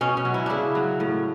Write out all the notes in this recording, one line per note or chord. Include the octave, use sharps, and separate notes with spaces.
B2 C#4
C#4
F#3
E4
C#3 D4 E4
F#3
A2